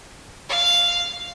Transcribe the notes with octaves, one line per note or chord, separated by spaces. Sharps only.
F5